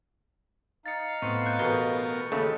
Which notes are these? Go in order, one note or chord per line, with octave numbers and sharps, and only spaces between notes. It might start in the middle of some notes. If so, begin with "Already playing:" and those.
D#4 F5 A6 C#7
A2 B3 C4 C#6 C#7
F#6 G6 C#7
A1 B2 B3 A#4 G7
D#2 C#3 A3